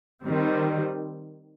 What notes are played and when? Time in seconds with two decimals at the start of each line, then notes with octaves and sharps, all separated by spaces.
0.25 D#3 G3 C4